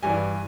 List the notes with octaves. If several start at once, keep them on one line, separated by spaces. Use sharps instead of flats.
G2 E3 G3 G#5